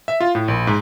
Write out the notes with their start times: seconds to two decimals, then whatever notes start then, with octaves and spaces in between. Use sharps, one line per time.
0.08 E5
0.20 F4
0.35 A2
0.48 A#1
0.67 G#2